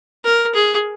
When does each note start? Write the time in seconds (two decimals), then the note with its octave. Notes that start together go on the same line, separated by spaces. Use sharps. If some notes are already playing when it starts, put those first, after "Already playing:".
0.24 A#4
0.55 G#4